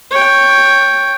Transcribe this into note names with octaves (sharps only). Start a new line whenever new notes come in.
C#5 G5